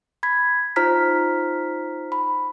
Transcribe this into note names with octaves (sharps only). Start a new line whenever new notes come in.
B5 G#6 B6
D#4 F4 C5 A#5 F6 B6
B5